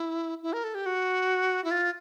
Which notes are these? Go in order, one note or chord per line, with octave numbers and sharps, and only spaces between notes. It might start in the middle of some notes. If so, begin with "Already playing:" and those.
Already playing: E4
E4
A#4
A4
G4
F#4
E4
F4